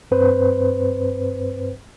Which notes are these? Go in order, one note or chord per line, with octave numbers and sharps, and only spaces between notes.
G2 C4 B4 C5